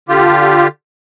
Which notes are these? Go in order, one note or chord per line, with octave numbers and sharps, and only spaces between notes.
D3 F4 G4